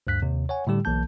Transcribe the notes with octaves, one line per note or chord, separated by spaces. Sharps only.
D2 G2 F#6 B6
D#2 C3
C#5 F#5 G#5
A2 D3 G3 G4
B1 E3 A#3 A5 G6